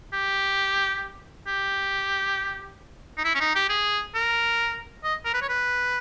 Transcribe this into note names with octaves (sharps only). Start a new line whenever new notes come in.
G4
G4
D#4
E4
C#4
D#4
G4
G#4
A#4
D#5
A#4
B4
C#5
B4